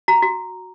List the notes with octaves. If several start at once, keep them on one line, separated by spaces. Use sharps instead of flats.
F#4 A#5
F#4